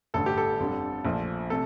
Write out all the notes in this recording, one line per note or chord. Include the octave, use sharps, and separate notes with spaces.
A1 G2 D3 A3 A4
G4
A4
G1 F2 D3 G3
A#1 A#2 F3 A3
C3 A3 A4